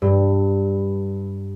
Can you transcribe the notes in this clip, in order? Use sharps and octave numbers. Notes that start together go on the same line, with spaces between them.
G2